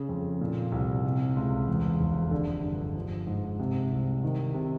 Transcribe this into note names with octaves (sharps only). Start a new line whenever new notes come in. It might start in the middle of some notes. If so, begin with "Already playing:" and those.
Already playing: C#3
F2
A#2
C2
C3
C#2
E2
F1
D3
G2
F3
G#2
C3
C2
D#3
C3